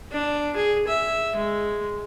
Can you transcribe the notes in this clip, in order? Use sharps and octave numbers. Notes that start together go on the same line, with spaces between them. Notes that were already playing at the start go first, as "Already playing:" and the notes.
D4
G#4
E5
G#3